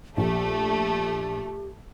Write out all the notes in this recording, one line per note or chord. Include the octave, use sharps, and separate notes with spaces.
A#1 A3 G4